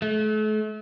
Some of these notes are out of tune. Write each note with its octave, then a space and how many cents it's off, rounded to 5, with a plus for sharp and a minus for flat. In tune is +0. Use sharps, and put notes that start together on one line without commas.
A3 -40